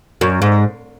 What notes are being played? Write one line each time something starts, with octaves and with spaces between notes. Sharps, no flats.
F#2
G#2